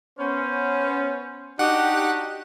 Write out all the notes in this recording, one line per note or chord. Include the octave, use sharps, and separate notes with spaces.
B3 C#4 C5
D4 D#4 F#4 G4 F#5